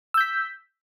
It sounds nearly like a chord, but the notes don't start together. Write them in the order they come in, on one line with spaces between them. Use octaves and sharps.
E6 G6 B6